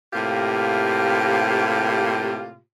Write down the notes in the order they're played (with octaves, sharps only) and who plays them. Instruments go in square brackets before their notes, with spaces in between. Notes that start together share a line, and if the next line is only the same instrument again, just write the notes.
[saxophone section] A2 C3 A#3 F4 G4